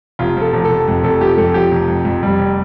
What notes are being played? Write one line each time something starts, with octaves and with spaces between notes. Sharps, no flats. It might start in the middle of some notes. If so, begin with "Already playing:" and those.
F1 F4
F3 A4
F1
A4
F1
F2
F1 A4
F3 G4
F2 A4
F3 G4
F1
F2
F2
F2 G3
F1